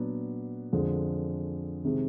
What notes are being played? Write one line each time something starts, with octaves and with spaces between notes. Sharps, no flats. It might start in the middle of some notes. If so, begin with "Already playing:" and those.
Already playing: A#2 F#3 B3 D4
F2 D3 F3 G#3
C3 D#3 G#3